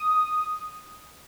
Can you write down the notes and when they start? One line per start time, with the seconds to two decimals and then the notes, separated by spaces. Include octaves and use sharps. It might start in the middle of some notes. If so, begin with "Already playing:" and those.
Already playing: D#6